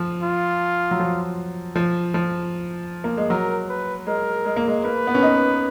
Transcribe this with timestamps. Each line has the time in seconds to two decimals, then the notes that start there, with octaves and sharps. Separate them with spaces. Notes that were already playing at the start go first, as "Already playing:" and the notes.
Already playing: F3
0.22 F4
0.91 F#3
1.00 F3
1.76 F3
2.14 F3
3.04 A#3
3.17 G#3
3.30 F#3 A#4
3.69 B4
4.07 G#3 A#4
4.45 G#3
4.56 A#3
4.68 G#3
4.84 A#3 B4
5.07 B3
5.15 C#4
5.22 D#4